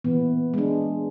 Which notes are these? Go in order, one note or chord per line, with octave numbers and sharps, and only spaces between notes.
A#2 E3 B3
G#3 D4